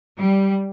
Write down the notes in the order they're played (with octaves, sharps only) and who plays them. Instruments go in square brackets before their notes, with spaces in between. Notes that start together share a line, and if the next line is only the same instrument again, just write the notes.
[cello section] G3